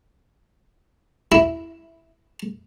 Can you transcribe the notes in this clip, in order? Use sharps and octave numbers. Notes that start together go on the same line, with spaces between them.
E4